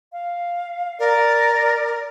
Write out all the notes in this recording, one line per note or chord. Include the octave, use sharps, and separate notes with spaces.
F5
A#4 D5